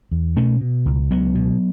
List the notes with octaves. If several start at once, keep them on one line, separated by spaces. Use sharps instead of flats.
E2
B2 A3 C#4
B2
C#2
C#2 F#3 B3
B2